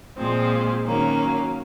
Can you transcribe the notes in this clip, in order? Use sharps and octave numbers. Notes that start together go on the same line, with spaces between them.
A#2 F3 G#3 C4
D#3 F#3 A#3 C#4